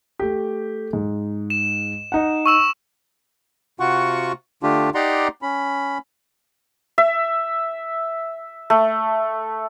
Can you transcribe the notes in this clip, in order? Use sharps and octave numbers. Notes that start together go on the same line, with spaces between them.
A3 G4
G#2
E7
D#4 F#5
C#6 E6 E7
C3 F4 F#4 F#5 C#6
D3 A3 D4 F4 G4
D#4 G4 D5 F#5 A#5 C6
C#4 B5
E5
A3